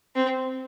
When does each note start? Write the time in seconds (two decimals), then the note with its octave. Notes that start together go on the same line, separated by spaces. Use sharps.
0.16 C4